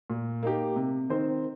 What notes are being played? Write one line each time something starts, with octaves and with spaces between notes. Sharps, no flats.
A#2
A#3 D#4 G4
C3
D#3 C4 D#4 C5